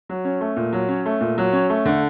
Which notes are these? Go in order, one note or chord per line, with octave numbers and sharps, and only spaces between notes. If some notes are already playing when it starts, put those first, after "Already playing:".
F#3
C#4
A3
A#2
F#3
C#4
A3
A#2
F#3
C#4
A3
D3